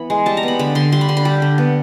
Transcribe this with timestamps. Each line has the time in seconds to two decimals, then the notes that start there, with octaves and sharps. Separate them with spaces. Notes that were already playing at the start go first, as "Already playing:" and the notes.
Already playing: E3 B3 B5
0.10 G#3
0.26 G3 A5
0.37 A#5
0.43 B3 B5
0.59 D3 B5
0.75 D3 C6
0.92 G3 C6
1.01 B5
1.09 D3 C6
1.17 B5
1.25 G3 G5
1.42 D3
1.58 B3